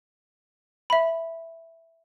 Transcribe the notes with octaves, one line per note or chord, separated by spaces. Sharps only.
E5 B5